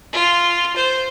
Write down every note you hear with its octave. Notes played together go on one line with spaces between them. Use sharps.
F4
C5